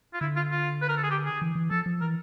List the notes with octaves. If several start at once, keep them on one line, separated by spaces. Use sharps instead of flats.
F4
D3 E4
F4
F4
B4
A#4
A4
G#4
G4
G#4
E3
E3
F3 A4
F3
E3 A#4